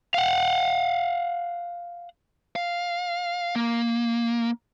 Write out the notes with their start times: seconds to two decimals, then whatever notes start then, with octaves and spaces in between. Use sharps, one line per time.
0.14 F5 F#5
2.56 F5
3.56 A#3